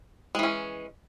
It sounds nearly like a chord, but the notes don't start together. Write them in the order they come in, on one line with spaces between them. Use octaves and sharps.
G#3 E3 C#4